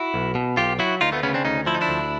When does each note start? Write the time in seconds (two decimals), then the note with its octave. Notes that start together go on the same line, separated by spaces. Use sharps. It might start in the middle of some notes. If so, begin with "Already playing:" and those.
Already playing: E4 F#4
0.14 B1
0.35 B2
0.57 B1 F4 G4
0.79 F#3 E4 F#4
1.01 D2 D#4 F4
1.12 A3 B3
1.23 C#3 B3 C#4
1.34 C4 D4
1.45 D2 C#4 D#4
1.66 F3 E4
1.74 D#4
1.81 D4 E4
1.89 D2